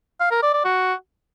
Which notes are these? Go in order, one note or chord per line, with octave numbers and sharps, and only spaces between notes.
F5
A#4
D5
D5
F#4